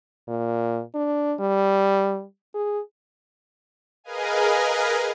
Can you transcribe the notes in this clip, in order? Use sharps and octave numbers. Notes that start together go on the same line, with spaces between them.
A#2
D4
G3
G#4
G#4 A#4 B4 D#5 F5 G#5